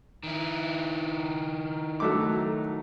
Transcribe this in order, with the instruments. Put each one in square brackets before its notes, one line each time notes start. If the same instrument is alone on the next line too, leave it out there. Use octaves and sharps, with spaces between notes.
[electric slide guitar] D#3 E4
[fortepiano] F#3 A3 D6